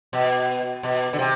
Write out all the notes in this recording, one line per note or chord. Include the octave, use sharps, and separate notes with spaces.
B2
B2
D3
C3